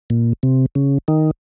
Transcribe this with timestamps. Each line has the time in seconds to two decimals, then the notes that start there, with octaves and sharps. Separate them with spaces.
0.10 A#2
0.43 C3
0.75 C#3
1.08 D#3